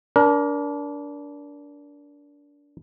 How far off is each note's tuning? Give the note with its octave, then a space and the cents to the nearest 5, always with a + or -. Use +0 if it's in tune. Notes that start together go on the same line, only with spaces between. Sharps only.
D4 -25 A#4 +25